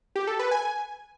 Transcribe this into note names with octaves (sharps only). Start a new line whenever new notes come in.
G4
A4
B4
G#5